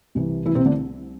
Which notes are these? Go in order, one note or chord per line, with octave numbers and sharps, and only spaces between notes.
C2 C3 E3
E3 E4
C3 C4
D3 D4